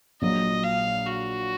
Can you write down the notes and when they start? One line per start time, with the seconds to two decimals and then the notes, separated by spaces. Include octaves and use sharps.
0.22 A#1 A#2 F#3 D#5
0.64 F5
1.06 F#4